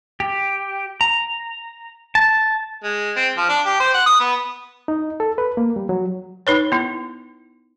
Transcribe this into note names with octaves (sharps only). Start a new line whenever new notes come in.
G4
A#5
A5
G#3
C4
F3
D4
G4
C5
F#5
D#6
B3
D#4
A4
B4
A#3
G3
F#3
D#4 B4 C#5
B3 E4